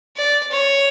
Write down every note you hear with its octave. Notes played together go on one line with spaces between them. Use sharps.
D5
C#5